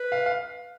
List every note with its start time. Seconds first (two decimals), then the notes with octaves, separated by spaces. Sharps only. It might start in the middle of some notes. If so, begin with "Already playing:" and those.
Already playing: B4
0.12 F5
0.26 F5